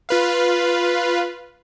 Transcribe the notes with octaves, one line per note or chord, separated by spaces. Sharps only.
F4 B4 F5